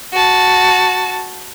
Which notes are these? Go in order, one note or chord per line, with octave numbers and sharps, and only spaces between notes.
F#4 A5